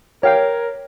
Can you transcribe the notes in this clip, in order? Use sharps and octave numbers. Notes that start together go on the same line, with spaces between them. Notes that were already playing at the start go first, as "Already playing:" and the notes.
G4 A#4 C#5 F5 G5